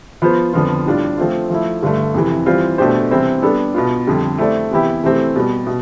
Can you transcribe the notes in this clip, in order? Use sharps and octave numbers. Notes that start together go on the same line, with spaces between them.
F3 B3 F4 C5
F2 D3 F3 B3 F4
A2 G3 D4 F4
F3 A3 C4 F4
F3 A3 E4
G2 D3 A3
F2 C3 E3
E3 G3 C4 F4
B2 A3 D4 G4 C5
C3 E3 G3 C4 E4
G3 B3 D4 A4
B2 B3 F4
F2 D3 G3
A3 C4 E4 A4 D5
C3 E3 B3 E4 G4
C3 E3 A3 C4 G4
B2 G3 B3
B2